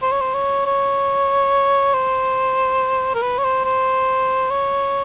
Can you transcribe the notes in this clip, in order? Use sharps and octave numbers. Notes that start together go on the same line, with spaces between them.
C5
C#5
C5
C#5
C#5
C5
A#4
B4
C#5
C5
C5
C#5